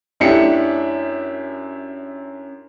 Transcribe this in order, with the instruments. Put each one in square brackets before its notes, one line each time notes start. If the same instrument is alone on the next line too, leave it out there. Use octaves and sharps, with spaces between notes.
[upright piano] F#2 A3 D4 E4 G4 C#7